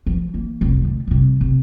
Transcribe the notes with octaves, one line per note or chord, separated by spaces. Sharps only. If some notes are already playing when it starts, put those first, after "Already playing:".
F3
E3 A#3
F1 C2
D3
C3 G3
C3